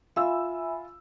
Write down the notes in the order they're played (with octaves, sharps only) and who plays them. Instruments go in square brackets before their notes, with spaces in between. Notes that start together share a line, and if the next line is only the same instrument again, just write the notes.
[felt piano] F4 E6 [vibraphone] E5 G#5 B5